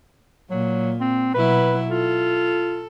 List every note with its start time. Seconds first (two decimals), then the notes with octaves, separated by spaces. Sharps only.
0.51 A#2 F#3
1.00 C4
1.34 B2 F#3 E4 B4
1.90 F4 A4